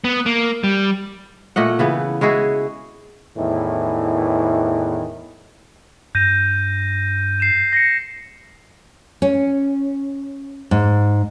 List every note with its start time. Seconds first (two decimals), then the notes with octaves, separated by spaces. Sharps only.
0.04 B3
0.26 A#3
0.64 G3
1.56 A#2 A3 D#5 F#5
1.79 C#3 E3 B3
2.21 G#3 E4 F#4 G#4
3.37 E2 A2 D#3 E3
6.15 G2 G6 A#6 D#7
7.40 C7 E7
7.73 A#6 C7 C#7
9.22 C#4
10.71 G#2